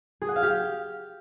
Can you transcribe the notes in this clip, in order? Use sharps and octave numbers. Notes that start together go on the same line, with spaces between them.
G#4
F#5
F5
G4